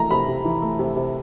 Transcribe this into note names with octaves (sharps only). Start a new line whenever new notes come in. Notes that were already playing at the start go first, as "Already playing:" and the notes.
Already playing: C3 E3 A3 A#5
C3 B5
C3
E3
A3
C3
C3